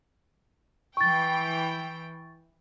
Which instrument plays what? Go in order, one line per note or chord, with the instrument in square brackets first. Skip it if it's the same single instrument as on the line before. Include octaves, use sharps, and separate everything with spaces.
[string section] E3 G5 [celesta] C#6 A6